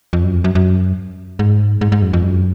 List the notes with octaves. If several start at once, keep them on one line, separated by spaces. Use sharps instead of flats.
F2
F#2
F2
F#2
F#2
G#2
G#2
G#2
F#2
F2
F#2